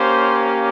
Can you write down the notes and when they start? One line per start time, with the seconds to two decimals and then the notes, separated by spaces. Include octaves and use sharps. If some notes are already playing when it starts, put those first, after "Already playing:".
Already playing: A#3 C#4 G4 C5